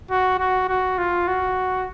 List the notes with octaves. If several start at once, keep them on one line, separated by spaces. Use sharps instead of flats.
F#4
F#4
F#4
F4
F#4